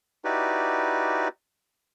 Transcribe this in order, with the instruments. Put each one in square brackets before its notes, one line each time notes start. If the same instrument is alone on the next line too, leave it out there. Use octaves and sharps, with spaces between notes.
[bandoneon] D#4 E4 F#4 G4 B4 D5